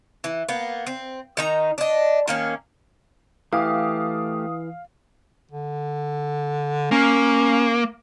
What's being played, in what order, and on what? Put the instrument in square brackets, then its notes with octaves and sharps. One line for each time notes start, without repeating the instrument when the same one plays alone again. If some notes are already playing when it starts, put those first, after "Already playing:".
[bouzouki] E3
A#3 B3
C4
D#3 D#4 A#5
D4 D#5
D#3 A#3 C#4
[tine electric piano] E3 [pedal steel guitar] A3 G4 [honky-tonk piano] F5 [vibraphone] D#6
[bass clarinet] D3
[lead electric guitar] A#3 [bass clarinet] C#4